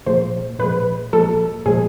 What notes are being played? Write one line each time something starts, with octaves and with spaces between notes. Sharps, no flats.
A#2 F3 G#3 C5
A#2 F3 G#3 B4
A#2 F3 G#3 A4
A#2 F3 G#3 G#4